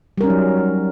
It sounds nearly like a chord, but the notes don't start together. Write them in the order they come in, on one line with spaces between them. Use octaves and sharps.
G3 A#4 C#4 D#4 F#3